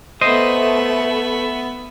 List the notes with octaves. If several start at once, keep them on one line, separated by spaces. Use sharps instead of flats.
A3 B3 C5 D#5 E5